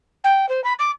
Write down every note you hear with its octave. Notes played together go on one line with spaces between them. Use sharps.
G5
C5
B5
D6